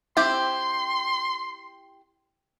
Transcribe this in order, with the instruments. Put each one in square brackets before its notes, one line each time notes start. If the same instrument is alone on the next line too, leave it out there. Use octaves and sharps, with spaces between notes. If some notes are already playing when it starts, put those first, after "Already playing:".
[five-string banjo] C4 E4 G4 [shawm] C6